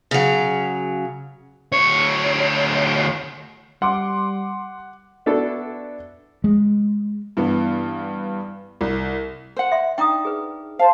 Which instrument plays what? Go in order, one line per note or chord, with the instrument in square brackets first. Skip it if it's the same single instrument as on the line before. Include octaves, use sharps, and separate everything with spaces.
[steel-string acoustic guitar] C#3 F#3
[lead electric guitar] D2 C#5
[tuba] G3 [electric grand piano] F#5 [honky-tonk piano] C6 D6
[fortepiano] B3 D4 E4 F#4 A4
[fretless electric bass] G#3
[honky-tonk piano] G2 E3 B3
C2
[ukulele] C5 F#5
[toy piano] E5 C6
[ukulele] D4 D#4 [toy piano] G5 D#6
[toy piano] G#4 B4
[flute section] C5 A5 [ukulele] F5